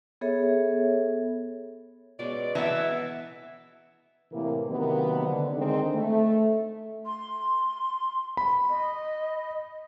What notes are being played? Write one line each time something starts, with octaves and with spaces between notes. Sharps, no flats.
B3 G#4 A4 C#5 E5
B2 G#3 C#4 D5
E3 B3 E5
A2 C3 E3 A#3
C3 D#3 F#3 A#3 B3
D3
D3 D#3 G#3 C4 D#4
A3
C6
B5
D#5